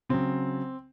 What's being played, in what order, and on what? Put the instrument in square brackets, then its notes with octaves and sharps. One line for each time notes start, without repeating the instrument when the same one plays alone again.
[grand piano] C#3 F#3 C4